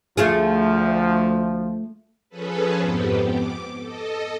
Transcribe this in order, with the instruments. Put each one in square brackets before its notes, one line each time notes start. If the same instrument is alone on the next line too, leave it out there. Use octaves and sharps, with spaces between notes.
[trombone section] D2 F3 [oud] A3 F4 G#4
[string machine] F3 C#4 G#4 A4 B4
F2 G#2 B3 G4
D6
A4 D#5